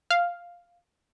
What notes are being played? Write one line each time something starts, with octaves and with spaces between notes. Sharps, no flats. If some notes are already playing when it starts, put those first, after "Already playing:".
F5